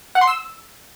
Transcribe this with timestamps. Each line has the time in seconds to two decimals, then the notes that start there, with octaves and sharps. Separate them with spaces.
0.15 F#5
0.21 C6
0.27 E6